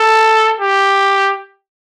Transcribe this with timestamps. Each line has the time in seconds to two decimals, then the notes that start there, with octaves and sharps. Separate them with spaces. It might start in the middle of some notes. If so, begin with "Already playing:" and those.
Already playing: A4
0.60 G4